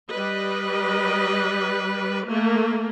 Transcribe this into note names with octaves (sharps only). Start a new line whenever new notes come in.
G3 B4 D#5
A3 A#3